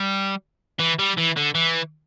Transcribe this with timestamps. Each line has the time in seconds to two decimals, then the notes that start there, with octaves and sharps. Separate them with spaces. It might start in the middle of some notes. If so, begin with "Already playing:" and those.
Already playing: G3
0.79 E3
0.99 G3
1.18 E3
1.37 D3
1.55 E3